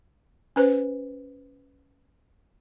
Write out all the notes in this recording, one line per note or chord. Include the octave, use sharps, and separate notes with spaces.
C#4 B4 C5